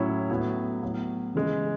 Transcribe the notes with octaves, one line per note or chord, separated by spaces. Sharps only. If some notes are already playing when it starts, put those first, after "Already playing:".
Already playing: A2 F#3 C#4 E4
A2 F#3 B3 E4
A2 F#3 B3
C#3 E3 G#3